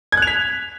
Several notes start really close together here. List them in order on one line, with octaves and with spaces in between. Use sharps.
G#6 F#6 F7 B6